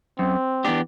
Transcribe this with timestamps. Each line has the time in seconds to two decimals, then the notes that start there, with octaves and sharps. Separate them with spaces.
0.19 F#2 C4
0.65 E3 B3 D4 G4